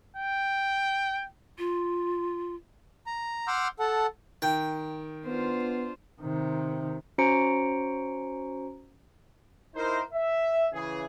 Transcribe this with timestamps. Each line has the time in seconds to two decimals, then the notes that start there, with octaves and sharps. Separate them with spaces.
0.17 G5
1.58 F4
3.07 A#5
3.48 F#5 C6 D6 E6 F6 G6
3.79 A4 F#5 A5
4.42 D#3 G5
5.26 B3 D4 F4 C5
6.22 C3 D#3
7.18 C#4 F#4 C5 A#5 C#7 D7
9.74 D#4 E4 A#4 C5
10.13 E5
10.73 C#3 E3 G#4